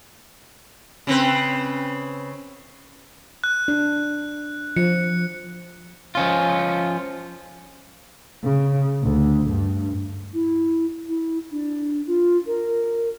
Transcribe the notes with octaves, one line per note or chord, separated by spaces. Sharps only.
C#3 C4 B4
F#6
D4
F3 C#7
F3 C#4 F4
C#3
D2
G2
E4
E4
D4
F4
A#4